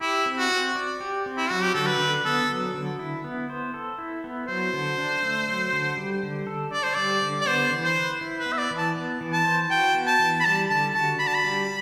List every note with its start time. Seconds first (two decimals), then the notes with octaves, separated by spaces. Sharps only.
0.01 E4 G4
0.26 C4
0.38 F#4
0.51 C4
0.75 D5
1.01 G4
1.26 C4
1.37 E4
1.50 F#3 F#4
1.63 G4
1.74 D3 A4
1.87 B4
2.00 D3
2.25 B3 A4
2.49 F#3
2.74 D3
2.99 E4
3.24 B3
3.50 C5
3.74 A4
3.98 E4
4.24 B3
4.48 F#3 C5
4.73 D3
4.98 D4
5.23 A3
5.48 F#3
5.73 D3
5.97 G3
6.23 D3
6.47 A4
6.73 D4 D5
6.83 C5
6.95 G3 D5
7.22 D3
7.41 D5
7.46 B3 C5
7.72 E3
7.84 C5
7.96 B4
8.21 E4
8.40 B4
8.46 B3
8.53 E5
8.58 D5
8.71 E3
8.78 A5
8.95 B3
9.21 E3
9.33 A5
9.45 C5
9.70 F#4 G5
9.94 B3
10.07 A5
10.19 E3
10.40 B5
10.45 G3 A5
10.70 D3 A5
10.95 F#4 A5
11.19 D4 B5
11.27 A5
11.35 B5
11.44 G3